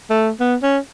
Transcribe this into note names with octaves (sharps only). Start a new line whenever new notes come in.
A3
B3
C#4